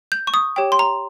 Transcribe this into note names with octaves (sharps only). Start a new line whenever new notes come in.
G6
C#6
D#6
G4 C#5 G5
C6
A#5